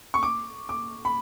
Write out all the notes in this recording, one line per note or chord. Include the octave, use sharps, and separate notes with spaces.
C#6
D6
D6
B5